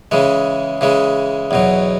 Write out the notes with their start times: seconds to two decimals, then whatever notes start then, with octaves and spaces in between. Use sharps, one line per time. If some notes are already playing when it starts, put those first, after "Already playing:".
0.11 C#3 E3 G#3
0.81 C#3 E3 G#3
1.51 E2 B2 F#3